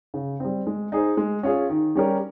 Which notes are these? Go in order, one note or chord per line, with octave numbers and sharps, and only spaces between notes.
C#3
G3 C4
G#3
D#4 G#4 C5
G#3
C#4 F4 G#4
D#3
G3 C#4 G4 A#4